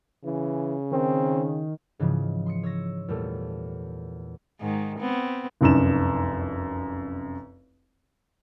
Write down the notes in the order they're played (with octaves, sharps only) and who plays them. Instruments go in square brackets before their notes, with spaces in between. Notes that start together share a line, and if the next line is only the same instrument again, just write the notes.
[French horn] C#3 [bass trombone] E3
[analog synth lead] D#3 [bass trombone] C4
[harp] G#2 C#3 E3 F3
C6 D#6 C#7
C#5 E6 A#6
E2 A#2 G3 A3
[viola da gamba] G#2 D#3
B3 C4
[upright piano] F1 C2 F#2 D#4 E7